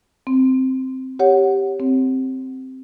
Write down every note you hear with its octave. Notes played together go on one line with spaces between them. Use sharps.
C4
G4 C#5 F#5
C4